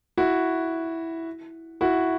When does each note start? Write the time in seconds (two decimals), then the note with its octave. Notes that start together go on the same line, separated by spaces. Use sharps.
0.17 E4 F#4
1.81 E4 F#4